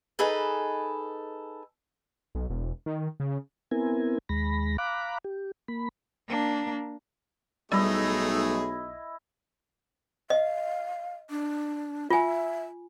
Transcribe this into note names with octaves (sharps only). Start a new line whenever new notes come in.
D#4 G#4 A4 B4
B1
E1
D#3
C#3
B3 C4 E4 A#4 G#5
D#2 G#3 B5 A#6
F5 A#5 B5 D6 F#6
G4
A#3 B5
A#3 D4
B1 G3 A3 D#4 E4 G#4 D#5
D#5 F5
D4
F4 E5 G#5